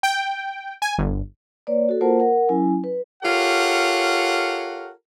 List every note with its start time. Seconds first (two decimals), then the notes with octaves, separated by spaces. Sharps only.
0.03 G5
0.82 G#5
0.98 G1
1.67 A#3 B4 C#5 D5
1.89 F#4 A4
2.01 A#3 F4 A#4 C5 F#5 A5
2.20 A#4 F#5
2.49 F#3 C#4 E4 G#5
2.84 B4
3.24 F4 G4 A4 A#4 C#5 F#5